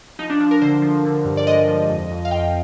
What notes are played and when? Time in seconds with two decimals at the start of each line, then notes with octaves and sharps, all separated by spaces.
0.19 F3 D#4
0.30 D4
0.40 F3 D4
0.51 A#4
0.62 D3 C5
0.82 F3
1.04 D3
1.25 G2
1.37 D5
1.47 G#3 D#5
1.68 F3
1.89 F2
2.11 F2
2.25 F5
2.31 F2 G5